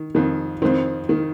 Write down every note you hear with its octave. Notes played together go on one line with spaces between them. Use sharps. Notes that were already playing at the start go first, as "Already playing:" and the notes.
Already playing: D#3
F2 D#3
F2 D#3 C4
D#3